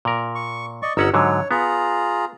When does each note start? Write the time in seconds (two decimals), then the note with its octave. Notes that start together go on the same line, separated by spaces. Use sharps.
0.05 A#2 A#4
0.35 C#6
0.82 D5 D#5 C#6
0.97 G1 C#4 D#5 F#5 A#5 E6
1.14 G#2 D3 F#3 C#5
1.51 B3 F4 G#4 A#5